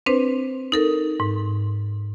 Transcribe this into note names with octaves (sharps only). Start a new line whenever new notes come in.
C4 D4 B4 C5
D#4 A4 A#4
G#2